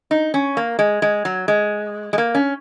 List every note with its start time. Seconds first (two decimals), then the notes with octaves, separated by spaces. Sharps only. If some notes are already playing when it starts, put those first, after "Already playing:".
0.11 D#4
0.34 C#4
0.57 A#3
0.79 G#3
1.02 G#3
1.25 F#3
1.48 G#3
2.13 G#3
2.18 A#3
2.35 C#4